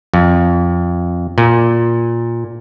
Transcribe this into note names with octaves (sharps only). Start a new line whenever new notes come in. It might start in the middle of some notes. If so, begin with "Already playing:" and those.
F2
A#2